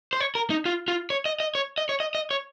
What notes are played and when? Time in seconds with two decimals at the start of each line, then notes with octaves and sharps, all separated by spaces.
0.13 C5
0.20 C#5
0.35 A#4
0.50 D#4
0.65 F4
0.88 F4
1.10 C#5
1.26 D#5
1.40 D#5
1.55 C#5
1.78 D#5
1.89 C#5
2.00 D#5
2.15 D#5
2.31 C#5